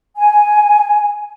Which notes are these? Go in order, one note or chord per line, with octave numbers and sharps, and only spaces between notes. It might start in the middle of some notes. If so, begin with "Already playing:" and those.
G#5